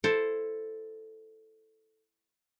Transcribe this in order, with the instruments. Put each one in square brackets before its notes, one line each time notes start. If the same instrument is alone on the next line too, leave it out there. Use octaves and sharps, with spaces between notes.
[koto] E4 A4 C5